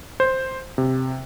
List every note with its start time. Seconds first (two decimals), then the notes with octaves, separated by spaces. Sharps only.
0.20 C5
0.78 C3